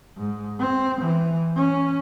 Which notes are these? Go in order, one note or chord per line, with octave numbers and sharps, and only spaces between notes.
G#2
C4
E3
C#4